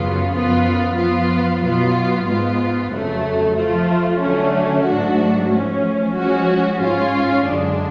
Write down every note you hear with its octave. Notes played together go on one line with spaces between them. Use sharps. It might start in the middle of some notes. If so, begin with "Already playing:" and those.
Already playing: F#2 C#3 F#3 B3 F4
F#2 F3 B3 F4
F3 B3 F4
B2 F#3 B3 F4
G#2 G#3 B3 F4
F2 C#3 F#3 A3
F3 A3 F4
D3 F#3 A3 C#4
G#2 F#3 A3 D4 F#4
F3 A3 C#4
F3 G#3 C#4 F#4
G#2 G#3 C#4 F4
F#2 D3 G#3 D4